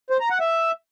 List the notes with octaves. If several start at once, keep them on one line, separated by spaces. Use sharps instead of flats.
C5
A#5
F#5
E5